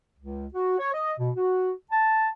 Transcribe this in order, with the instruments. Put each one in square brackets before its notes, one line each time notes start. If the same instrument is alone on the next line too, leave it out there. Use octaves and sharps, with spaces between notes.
[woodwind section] C#2
F#4
C#5
D#5
B2
F#4
A5